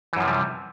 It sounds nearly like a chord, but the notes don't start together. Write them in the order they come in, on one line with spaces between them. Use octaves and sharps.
E3 F#2 F3 C3 G3